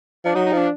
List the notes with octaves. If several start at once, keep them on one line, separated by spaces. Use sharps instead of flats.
F3 D4
F#3 D#4
D#4
F3 D4